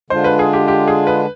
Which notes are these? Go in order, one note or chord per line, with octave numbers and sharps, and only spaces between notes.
D3 G#3 D4 F4 C5
B4
G#4
G4
G4
G#4
B4